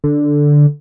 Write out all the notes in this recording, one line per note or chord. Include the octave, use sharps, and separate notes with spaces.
D3